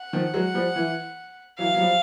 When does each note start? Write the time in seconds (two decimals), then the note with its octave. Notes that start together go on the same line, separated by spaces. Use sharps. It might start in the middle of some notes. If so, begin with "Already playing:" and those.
Already playing: F#5
0.13 D#3 F3
0.34 F#3 G#3
0.54 F3 G3
0.76 E3
1.59 E3 F#3 F5
1.74 F#3
1.80 F3 G3